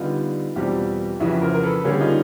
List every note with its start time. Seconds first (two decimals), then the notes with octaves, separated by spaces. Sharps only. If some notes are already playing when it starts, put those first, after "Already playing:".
Already playing: D3 G3 B3 D#4 F4
0.56 E2 B2 G3 C4 F4 G4
1.20 F2 C#3 E3 E4 F#4
1.42 A#4 C5
1.54 A#4
1.63 A4 B4
1.84 D3 G3 A#3 C#4 G#4 A#4
2.01 D#4 F4